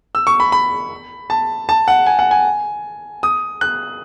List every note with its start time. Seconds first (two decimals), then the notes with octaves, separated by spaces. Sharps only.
0.15 E6
0.27 C#6
0.40 B5
0.52 B5
1.30 A5
1.69 A5
1.88 F#5
2.06 G#5
2.19 F#5
2.31 G#5
3.23 D#6
3.61 F#6